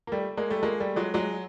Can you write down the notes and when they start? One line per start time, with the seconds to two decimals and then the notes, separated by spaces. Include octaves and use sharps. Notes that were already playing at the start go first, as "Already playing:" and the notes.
0.07 A#3
0.12 G3 A3
0.37 G#3 A#3
0.50 G3 A3
0.63 G#3 A#3
0.80 G3 A3
0.96 F#3 G#3
1.14 F#3 G#3